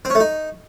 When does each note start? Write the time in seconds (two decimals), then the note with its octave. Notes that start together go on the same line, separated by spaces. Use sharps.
0.05 C4
0.10 C#4
0.15 A3
0.20 D#4